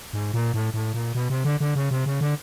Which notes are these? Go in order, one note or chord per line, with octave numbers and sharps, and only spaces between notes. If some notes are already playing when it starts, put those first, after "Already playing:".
G#2
A#2
A2
A2
A#2
B2
C3
D3
D3
C#3
C3
C#3
D3